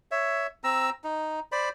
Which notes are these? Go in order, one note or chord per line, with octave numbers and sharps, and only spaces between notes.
C#5 E5
C4 A#5 E6
D#4
C5 D5 B5